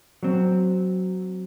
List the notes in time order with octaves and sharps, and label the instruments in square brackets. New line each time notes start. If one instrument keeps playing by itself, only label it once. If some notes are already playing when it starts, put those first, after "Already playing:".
[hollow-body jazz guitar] F#3 C4